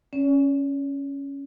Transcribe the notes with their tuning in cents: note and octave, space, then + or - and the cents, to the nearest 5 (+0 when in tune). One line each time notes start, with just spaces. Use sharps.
C#4 +0 D5 -45